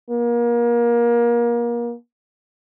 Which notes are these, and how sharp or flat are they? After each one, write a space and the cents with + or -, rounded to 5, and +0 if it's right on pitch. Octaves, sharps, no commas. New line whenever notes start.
A#3 +30